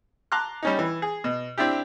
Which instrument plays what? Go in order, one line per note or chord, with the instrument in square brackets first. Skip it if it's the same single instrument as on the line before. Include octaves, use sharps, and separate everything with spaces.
[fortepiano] A5 A#5 C6 D6 F#6
G3 C#4 D#4
E3
G#4
B2
C4 D4 E4 G4